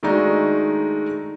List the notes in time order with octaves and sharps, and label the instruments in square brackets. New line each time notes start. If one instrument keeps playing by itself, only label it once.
[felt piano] D#3 G#3 A3 D4 D#4 F#4